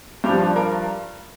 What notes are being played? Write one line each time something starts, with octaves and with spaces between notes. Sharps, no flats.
G2 F3 G4
D4
A#4